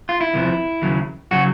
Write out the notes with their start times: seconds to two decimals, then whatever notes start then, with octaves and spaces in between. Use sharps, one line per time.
0.09 F4
0.21 E4
0.34 E2 C3 F3
0.82 D#2 C#3 F#3
1.31 C#3 F#3 F#4